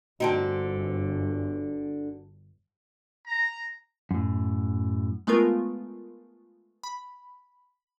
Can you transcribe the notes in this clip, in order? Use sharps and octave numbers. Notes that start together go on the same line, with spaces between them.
G1 D3 C4 D#4 F#4 A5
A#5
F#2 A2
G#3 A3 B3 F4 A#4
B5